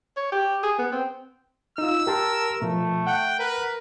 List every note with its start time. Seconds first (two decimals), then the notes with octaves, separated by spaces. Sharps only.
0.17 C#5
0.32 G4
0.63 G#4
0.79 B3
0.92 C4
1.78 D#4 F4 E6
2.07 G4 A#4 A5 C6
2.62 B2 F3 A3
3.07 F#5 G5 F#6
3.39 A#4 B4